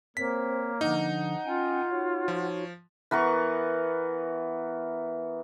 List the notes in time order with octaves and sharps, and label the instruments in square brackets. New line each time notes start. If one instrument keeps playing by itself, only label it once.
[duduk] A#3 [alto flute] C4 [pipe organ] A#4 C#5 [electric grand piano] B6
[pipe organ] D3 F3 D4 [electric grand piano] D#4 [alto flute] F#5
[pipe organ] C#4 G5 G#5 [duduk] F4
[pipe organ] D#4 F#4 C#5
[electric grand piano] F3
[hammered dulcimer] E3 B3 A#4 C#6